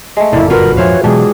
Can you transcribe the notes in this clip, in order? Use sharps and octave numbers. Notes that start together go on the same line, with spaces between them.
G#3 A3
F#1 F2 A2 D3 A#3 E4
F4 F#4 A#4 B4
A#1 F2 G#2 E3 C5 C#5 F5
G#2 B2 E3 F#3 D4 G4 G#4